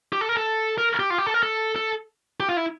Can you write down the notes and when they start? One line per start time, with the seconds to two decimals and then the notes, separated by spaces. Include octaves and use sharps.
0.13 G4
0.21 A4
0.29 A#4
0.37 A4
0.78 A#4
1.00 G4
1.10 F4
1.18 G4
1.26 A4
1.34 A#4
1.43 A4
1.76 A4
2.40 G4
2.49 F4
2.57 E4